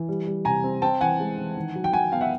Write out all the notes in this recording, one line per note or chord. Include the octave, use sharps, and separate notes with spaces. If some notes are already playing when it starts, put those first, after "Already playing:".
Already playing: E3
G3
G3
C3 G#5 A#5
C4
C4 G5 A5
E3 F#5 G#5
G#3
E3
D#3
F#3
G5
F#3 F#5 G#5
B3 F5 G5
E5 F#5